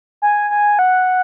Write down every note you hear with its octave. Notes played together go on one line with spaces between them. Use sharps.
G#5
G#5
F#5